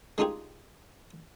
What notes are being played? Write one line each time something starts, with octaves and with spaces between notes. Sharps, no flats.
G#3 D4 D#4 F4 G4 G#4